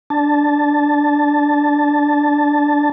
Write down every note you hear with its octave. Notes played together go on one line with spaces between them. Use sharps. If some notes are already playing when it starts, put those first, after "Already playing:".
D4 A5